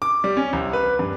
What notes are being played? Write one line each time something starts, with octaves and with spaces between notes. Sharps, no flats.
D6
G3
C#4
C2
B4
G2